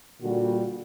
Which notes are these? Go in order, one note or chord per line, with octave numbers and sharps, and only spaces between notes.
A#2 D3 G3 F#4